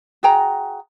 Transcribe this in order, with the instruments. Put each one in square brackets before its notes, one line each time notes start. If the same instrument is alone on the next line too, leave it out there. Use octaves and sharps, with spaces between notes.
[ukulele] F#4 G#4 G5 A#5